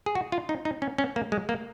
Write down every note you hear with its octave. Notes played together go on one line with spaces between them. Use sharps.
G#4
F#4
F4
D#4
D#4
C#4
C#4
A#3
G#3
A#3